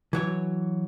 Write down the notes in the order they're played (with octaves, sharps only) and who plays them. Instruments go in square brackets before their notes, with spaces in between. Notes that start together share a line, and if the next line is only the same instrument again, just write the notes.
[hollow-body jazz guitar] E3 F#3 C#5